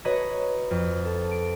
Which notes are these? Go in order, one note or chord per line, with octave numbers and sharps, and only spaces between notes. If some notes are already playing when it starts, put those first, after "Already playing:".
F#4 B4 C#5 D#5 A#5
F2
A4
D7